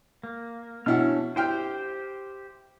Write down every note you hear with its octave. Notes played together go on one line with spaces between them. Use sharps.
A#3
B2 C#4 D4 E4 F#5 F6
E4 G4 C5 G5 F6